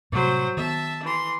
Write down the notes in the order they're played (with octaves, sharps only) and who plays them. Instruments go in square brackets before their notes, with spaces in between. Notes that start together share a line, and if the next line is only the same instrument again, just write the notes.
[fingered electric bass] A2 C3 G3 [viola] F#3 C5
[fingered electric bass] D#3 B3 [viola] E5 A5
[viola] E3 C6